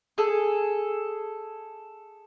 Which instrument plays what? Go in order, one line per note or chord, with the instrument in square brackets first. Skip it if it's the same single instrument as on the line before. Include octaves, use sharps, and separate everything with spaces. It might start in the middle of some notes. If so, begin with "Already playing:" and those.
[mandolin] G#4 A4